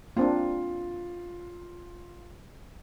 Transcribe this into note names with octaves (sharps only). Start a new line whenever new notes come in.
A#3 C4 D4 F4